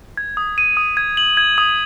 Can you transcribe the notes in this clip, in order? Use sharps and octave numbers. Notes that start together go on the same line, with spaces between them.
G#6
D#6
D#7
D#6
G#6
F#7
G#6
D#6